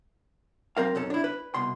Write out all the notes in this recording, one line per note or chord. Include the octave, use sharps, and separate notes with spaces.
F#3 C4 A#4 F5
B1 F#2 C#4 A4
D4 E4
B4
C2 B2 C6